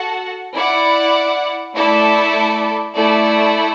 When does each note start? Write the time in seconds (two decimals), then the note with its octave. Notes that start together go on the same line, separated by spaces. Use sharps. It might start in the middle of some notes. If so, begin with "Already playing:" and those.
Already playing: F#4 A4 F#5 A5
0.54 E4 D5 F#5
1.75 A3 E4 A4 D5
2.96 A3 E4 A4 D5